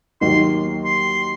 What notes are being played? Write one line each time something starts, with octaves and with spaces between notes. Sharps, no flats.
D#2 D#3 F#3 A#3 D#4 C6
C6